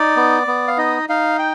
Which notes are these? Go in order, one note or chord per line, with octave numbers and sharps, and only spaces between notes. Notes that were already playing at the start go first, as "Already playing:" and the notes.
Already playing: D#4 D5
B3
B3
F5
D#4 D#5
D#4 F5
G5